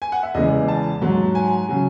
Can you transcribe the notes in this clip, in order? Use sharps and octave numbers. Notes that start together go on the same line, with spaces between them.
G#5
F#5
E5
E2 C#3 E3 G#3 D#5
A5
G#2 F#3
G#5
C#3 F#3